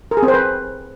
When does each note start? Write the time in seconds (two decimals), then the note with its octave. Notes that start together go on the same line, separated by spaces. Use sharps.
0.11 A#4
0.17 G#4
0.23 C4
0.28 C5
0.34 B4